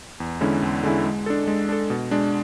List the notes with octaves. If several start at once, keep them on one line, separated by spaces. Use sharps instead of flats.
E2
D3 G#3 C#4 E4
E2
D3 G#3 C#4 E4
G#3
D4 A4
G#3
D4 A4
B2
G#3 D4